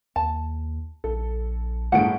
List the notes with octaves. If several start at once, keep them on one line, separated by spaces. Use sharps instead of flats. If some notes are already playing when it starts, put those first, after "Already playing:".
D#2 A5
A#1 A4
G1 A2 G#4 F#5 D7